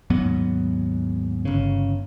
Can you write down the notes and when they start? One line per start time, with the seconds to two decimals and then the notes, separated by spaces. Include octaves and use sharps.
0.10 D#2 G#2 F#3 B3
1.45 G1 C#3